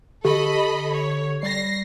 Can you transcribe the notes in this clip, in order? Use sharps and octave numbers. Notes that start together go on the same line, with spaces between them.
D3 G4 A4 D#5 B5
C#5
G3 A#6 C7